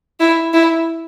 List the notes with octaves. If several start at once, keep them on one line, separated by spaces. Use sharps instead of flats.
E4
E4